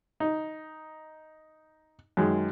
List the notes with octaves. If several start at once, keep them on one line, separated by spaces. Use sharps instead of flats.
D#4
F#2 D#3 G#3